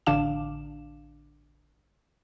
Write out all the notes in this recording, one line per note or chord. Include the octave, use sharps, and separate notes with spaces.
A1 D3 D4 F5 D6 E7